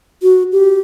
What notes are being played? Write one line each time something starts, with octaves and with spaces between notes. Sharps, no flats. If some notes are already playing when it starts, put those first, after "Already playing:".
F#4
G4